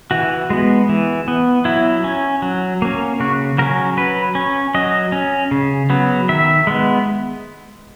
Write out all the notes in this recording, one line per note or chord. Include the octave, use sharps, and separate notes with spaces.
E3 F#4
G#3 B3
E3
B3
F#3 E4
C#4
F#3
A#3 C#4
C#3 F#4
F#3 C#4 A#4
F#3 B4
C#4
F#3 D#5
C#4
C#3
F#3 B3
D#3 E5
G#3 B3